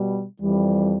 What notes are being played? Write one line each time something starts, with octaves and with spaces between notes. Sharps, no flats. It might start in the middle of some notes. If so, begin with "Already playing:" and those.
Already playing: B2 G3
F2 E3 G3